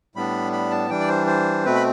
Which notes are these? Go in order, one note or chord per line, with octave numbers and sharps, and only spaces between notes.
A2 G3 B3 D4 B5
B5
A5
E3 G3 D4 G5
D5
C5
C5
B2 A3 C4 B4
B5